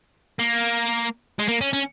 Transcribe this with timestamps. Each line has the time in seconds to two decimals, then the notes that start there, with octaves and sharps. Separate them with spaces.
0.39 A#3
1.39 G#3
1.48 A#3
1.61 C#4
1.73 C#4